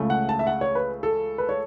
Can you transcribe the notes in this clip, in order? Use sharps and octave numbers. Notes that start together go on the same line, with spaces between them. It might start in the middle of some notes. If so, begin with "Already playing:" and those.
Already playing: C#2 C#3 A3
F#5
A5
E5
F#5
C#5
B4
A4
B4
C#5